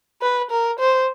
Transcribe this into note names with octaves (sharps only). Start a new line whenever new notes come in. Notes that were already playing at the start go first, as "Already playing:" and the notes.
B4
A#4
C5